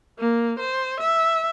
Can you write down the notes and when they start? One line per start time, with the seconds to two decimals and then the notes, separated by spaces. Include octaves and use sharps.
0.19 A#3
0.59 C5
1.00 E5